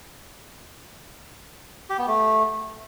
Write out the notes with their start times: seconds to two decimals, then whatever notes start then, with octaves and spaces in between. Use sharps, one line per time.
1.90 G4
1.99 B3
2.07 A3